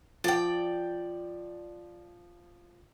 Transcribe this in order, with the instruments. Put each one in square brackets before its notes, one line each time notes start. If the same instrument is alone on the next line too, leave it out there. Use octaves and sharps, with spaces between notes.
[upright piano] F3 [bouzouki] D5 G5